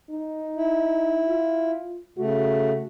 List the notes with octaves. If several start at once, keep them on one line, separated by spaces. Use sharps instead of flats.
D#4
E4
F4
C#3 A3 F#4